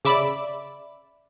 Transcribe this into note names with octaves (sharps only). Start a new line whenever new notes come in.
C#3 D5 E5 B5 D6